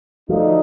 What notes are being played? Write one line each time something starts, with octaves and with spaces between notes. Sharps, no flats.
D2 D3 F3 A3 D#4